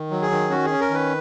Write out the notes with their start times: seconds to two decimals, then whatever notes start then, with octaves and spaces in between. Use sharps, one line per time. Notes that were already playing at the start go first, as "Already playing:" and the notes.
Already playing: D#3
0.11 F#3
0.22 G#4
0.31 D#3
0.50 C#4 F#4
0.65 C#4 G#4
0.80 A#4
0.90 D#3 B4